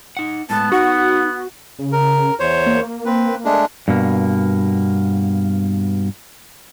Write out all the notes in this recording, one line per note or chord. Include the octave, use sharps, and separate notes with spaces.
D#4 F#5
A2 G#3 B3 A5
D#4 F#4 F#5
C#3
A#4
E2 C5 C#5
A#3
C4 B4
G#3 A3 D4
G2 B2 A#3